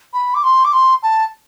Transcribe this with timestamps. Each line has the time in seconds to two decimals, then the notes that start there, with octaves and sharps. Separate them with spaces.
0.13 B5
0.34 D6
0.44 C6
0.65 D6
0.73 C6
1.03 A5